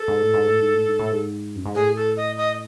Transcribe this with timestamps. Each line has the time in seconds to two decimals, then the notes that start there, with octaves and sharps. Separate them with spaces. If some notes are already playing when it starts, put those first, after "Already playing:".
Already playing: A4
0.08 G#2
0.22 A2
0.34 G#2
0.47 A2
0.60 G#2
0.74 A2
0.86 G#2
0.99 A2
1.11 G#2
1.55 F#2
1.65 G#2
1.75 A2 G#4
1.96 A4
2.17 D#5
2.37 D#5